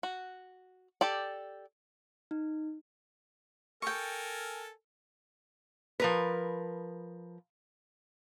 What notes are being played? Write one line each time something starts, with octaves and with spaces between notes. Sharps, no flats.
F#4
G4 A4 D5
D#4
A4 A#4 G5 G#5 C#6
F3 A#4 B4